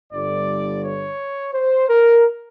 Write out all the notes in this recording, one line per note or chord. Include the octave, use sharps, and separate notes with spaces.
G1 G2 D3 D5
C#5
C5
A#4